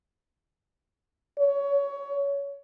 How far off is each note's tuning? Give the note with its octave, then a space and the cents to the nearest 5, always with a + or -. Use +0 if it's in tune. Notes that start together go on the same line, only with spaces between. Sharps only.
C#5 +20